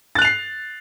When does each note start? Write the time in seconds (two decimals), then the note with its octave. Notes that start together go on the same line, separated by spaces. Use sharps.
0.15 A6
0.19 F#6
0.22 F7
0.25 C7